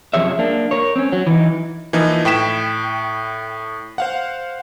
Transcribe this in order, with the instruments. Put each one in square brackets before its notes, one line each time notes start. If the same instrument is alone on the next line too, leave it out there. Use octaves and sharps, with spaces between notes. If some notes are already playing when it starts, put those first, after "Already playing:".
[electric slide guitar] F#2 C3 F3 G#4 C#5 E5
A#3 D4
A#4 C#5
C4 C#4
F#3
E3 D#4
[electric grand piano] E3 F3 A#3 D#4
A2 G5 B6 E7
C5 F5 F#5